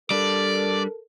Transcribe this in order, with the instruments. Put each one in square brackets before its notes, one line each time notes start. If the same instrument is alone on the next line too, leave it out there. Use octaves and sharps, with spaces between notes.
[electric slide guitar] G3 D4 [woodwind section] A4 A#4 [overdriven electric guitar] D5